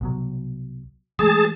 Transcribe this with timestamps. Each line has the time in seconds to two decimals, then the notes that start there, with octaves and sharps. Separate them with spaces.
0.01 C2 B2 F#3
1.19 E3 G#3 A3 G#4 A5